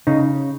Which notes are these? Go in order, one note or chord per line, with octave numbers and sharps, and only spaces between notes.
C#3 D#4